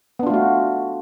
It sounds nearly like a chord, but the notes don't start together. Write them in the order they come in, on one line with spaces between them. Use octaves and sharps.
B3 D4 F4 A3 F#4